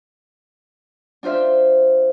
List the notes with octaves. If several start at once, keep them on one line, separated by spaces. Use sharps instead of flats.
D4 F4 C5 E5